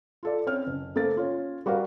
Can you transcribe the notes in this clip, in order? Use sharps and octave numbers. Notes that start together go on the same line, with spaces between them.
F4 A4 D5
C4 C#4 F6
F#1
A3 A#3 A4 C5 A6
C#4 F4
G3 F#4 A#4 F5